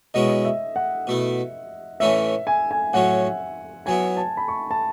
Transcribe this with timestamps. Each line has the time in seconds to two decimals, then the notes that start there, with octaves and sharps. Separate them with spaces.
0.14 B2 G#3 C#4 E4 D#5
0.45 E5
0.76 F#5
1.07 B2 A3 E4
2.00 A2 E3 A3 C#4 E4 E5
2.47 G#5
2.71 G#5
2.93 A2 F#3 C#4 F#5
3.86 F#3 B3 E4 G#5
4.17 A5
4.37 B5
4.48 C#6
4.71 A5